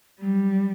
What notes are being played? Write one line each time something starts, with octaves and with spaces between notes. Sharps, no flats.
F#3 G3